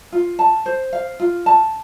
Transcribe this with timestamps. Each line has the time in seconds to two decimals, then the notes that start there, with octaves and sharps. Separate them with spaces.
0.12 F4
0.39 A5
0.66 C5
0.93 F5
1.20 F4
1.46 A5